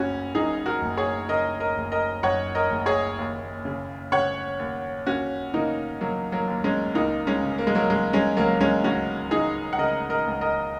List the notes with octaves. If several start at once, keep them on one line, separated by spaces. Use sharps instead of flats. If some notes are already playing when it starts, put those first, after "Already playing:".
Already playing: F#1 C#3 C#4 F#4
F#2 D#4 G#4
F#4 A#4
F#1
G#4 C#5
C#3 A#4 D#5
A#4 D#5
F#1
A#4 D#5
F#2 C#5 F#5
A#4 D#5
F#1
G#4 C#5
D#2
C#3
C#3 C#5 F#5
D#2
D#2 C#4 F#4
C#3 A#3 D#4
C#3 F#3 A#3
F#3 A#3
D#2
G#3 C#4
C#2 A#3 D#4
G#3 C#4
C#3
A#3
G#3
F#3 A#3
C#3 G#3
G#3 C#4
C#2 F#3 A#3
G#3 C#4
C#2 C#4 F#4
C#3 D#4 G#4
F#5
C#3 A#4 D#5
A#4 D#5
C#2
A#4 D#5